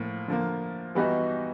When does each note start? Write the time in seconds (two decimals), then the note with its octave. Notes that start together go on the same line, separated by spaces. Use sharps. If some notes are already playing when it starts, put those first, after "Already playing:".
Already playing: A2 F3 A#3
0.28 D3 F3 A#3
0.95 E3 G3 B3 D#4 F#4